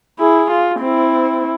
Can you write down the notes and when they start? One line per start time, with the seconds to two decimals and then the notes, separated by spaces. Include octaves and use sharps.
0.19 E4 G#4
0.51 F4
0.80 C4 E4